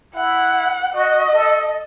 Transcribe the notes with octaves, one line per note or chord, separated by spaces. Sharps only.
E4 F#5
F#4 D#5
A4